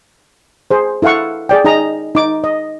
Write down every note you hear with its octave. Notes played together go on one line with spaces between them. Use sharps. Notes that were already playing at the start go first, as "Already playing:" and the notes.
G#4 C5
E4 A4 F5 F#5 C#6
G#4 D5 G5
D#4 G#4 D#5 A#5
D#4 D6
D#5